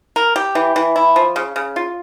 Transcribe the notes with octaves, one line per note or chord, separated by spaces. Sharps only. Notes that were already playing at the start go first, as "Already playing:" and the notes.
A#4
G4
E3
E3
E4
F3
C#3
C#3
F4